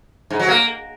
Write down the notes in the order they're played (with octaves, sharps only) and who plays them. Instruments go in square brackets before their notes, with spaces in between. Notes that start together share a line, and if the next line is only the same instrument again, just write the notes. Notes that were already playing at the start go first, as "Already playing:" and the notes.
[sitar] G#2
F#3
A#3